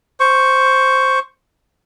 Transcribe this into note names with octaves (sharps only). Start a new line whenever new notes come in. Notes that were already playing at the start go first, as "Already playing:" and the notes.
C5 C#6